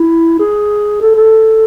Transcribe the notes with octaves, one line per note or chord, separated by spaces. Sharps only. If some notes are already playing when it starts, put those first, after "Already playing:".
Already playing: E4
G#4
A4
A4